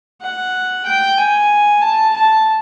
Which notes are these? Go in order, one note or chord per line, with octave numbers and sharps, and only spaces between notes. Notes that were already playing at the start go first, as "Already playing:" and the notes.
F#5
G5
G#5
A5
A5